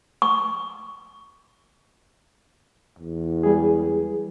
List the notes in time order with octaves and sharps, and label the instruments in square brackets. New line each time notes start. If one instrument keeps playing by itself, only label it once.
[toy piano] C#6
[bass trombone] E2
[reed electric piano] G3 G#4